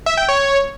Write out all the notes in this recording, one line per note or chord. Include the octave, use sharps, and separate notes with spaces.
E5
G5
C#5